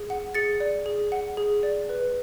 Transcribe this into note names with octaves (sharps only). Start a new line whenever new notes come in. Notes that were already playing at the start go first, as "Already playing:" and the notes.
Already playing: G#4
F#5
G#4 A6 C#7
D5
G#4
F#5
G#4
D5
B4